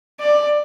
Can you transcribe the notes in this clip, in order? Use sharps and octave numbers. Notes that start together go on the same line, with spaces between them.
D5